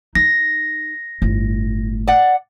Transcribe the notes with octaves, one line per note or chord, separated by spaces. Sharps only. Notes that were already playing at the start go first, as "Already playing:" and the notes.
D#4 A#6
G1 A2
D5 F#5